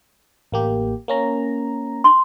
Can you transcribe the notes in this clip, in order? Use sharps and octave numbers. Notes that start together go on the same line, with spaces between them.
A1 A#3 G4
A#3 C#4 A#5
C6